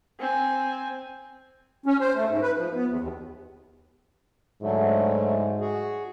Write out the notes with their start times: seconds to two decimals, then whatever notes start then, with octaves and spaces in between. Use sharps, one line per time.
0.20 C4 G#5
1.86 C#4
2.00 C5
2.15 A3
2.29 G#2
2.42 B4
2.57 F3
2.75 B3
2.87 E2
3.01 D#2
4.63 G#2 D3 F#3 A3
5.61 F#4 G#4